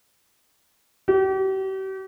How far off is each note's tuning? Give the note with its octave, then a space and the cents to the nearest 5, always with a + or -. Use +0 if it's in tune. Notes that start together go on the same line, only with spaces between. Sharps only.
G4 -40